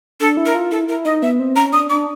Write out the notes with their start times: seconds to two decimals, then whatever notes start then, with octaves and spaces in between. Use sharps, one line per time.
0.20 D4 A4
0.37 E4
0.46 A#4
0.55 F4
0.71 E4 A4
0.88 E4 A#4
1.05 D#4 D#5
1.22 B3 E5
1.39 C4
1.56 C#4 A#5
1.73 D4 D#6
1.90 D4 D6